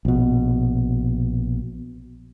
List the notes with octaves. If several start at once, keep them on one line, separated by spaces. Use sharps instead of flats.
A#1 B2